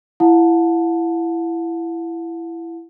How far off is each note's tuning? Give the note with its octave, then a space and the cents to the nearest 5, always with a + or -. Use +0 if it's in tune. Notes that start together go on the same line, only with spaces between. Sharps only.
E4 +20 F#5 -40 A5 +0